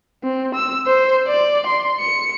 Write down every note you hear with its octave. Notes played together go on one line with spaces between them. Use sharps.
C4
E6
C5
D5
C6
C#7